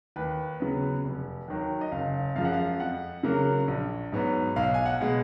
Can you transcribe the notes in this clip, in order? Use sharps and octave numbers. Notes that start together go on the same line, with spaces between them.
D#2 B4
C#3 F#3 B3
F1
D#2 D#3 F#3
D#5
F#1 F5
F#2 F3 G#3 F5
F#5
F5
F2 F#5
C#3 F#3 A#3
A#1
G#2 F#3 B3
B1 F5
G#5
F#5
B2 G#3